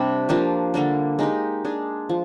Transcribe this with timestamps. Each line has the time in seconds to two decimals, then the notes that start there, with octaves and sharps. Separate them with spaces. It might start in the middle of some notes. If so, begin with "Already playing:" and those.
Already playing: C3 G3 D4 G4
0.29 F3 A#3 D4 G4
0.74 D3 G3 A#3 D4
1.19 G#3 D#4 G4
1.65 G#3 D4 G#4
2.09 F3